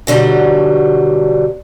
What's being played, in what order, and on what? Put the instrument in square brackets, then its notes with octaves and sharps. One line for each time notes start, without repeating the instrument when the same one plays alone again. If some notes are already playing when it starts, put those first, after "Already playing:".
[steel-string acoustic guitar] B2 D3 F#3 G3